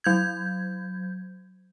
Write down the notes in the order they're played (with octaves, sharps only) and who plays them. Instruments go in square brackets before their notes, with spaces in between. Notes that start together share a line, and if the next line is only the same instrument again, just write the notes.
[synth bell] F#3 G6 G#6